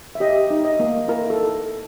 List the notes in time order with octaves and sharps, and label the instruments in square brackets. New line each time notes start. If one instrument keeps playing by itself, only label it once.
[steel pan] E5
G4 D#5
D#4
D#5
A#3
E4 A#4
A4